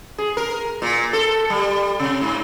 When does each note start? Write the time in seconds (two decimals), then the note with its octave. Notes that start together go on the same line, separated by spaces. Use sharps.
0.18 G#4
0.37 A#4
0.82 A#2
1.13 A4
1.50 G3
2.00 C3
2.21 G#2